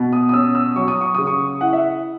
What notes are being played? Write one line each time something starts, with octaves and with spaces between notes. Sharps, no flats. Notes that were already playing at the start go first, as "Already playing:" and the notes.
Already playing: B2
D#6
D#6
C#4 E6
E6
F#3 C#6
D#6
C#6
C#3 D#6
C#6
E4 F#5
E5